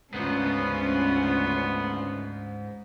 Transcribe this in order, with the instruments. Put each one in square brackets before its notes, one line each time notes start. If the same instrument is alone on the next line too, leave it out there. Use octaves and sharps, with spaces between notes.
[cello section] D2 A3 F4 [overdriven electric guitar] G#2 [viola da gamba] C#3 C#4 [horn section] B3